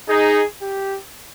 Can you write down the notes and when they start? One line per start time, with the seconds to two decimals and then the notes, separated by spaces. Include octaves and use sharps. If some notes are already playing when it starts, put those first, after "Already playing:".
0.09 D#4 G#4
0.62 G4